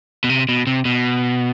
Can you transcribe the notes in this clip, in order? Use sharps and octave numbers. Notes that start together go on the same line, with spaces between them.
B2
C3
B2
C3
B2